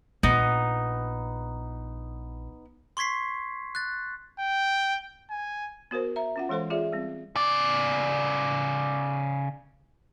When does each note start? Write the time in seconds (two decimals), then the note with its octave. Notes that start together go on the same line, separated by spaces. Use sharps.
0.23 A#1 B3 D#4
2.97 C6 C#6 G#6 B6 C7
3.75 F#6 A6
4.40 G5
5.30 G#5
5.91 B3 F#4 A#4 C5
6.16 E5 A#5
6.36 C#4 F4 F#5
6.49 E3 G#3 A4 C5 C6
6.70 F4 G#4 D5 E5
6.92 G3 C4
7.36 C#3 D5